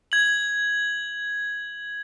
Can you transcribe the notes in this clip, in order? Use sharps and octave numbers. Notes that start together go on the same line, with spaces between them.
G#6 F#7